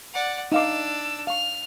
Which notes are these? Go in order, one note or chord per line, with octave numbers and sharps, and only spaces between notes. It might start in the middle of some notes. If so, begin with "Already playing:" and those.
D5 F#5
D4 D#4 F5 D6 E6
F5 C#6 F6